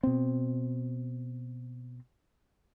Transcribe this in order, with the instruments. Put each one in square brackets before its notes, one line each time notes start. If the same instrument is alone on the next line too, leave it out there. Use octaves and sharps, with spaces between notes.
[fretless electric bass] B2 C4